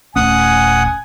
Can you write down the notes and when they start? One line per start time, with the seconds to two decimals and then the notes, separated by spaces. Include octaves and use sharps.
0.16 D#1 A3 C#4 F#5 G#5 D#6